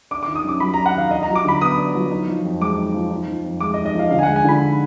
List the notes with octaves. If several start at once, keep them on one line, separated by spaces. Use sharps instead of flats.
D4 D6
D6
D#3
D#6
F#2 D6
F#3 B5
A#5
D4
F#5
D#3 F5
D4 D#5
A#5
F#3
D6
D3 B5
B3 D#6
D4
F#3
D#4
F3
F2
G#3 D6
D#4
F3
D#4
F3
F2
G#3 D6
D#5
D#4
D#5
F3 F5
D3 F5
G#5
F#5
G#3
G#5
D3 B5
D#4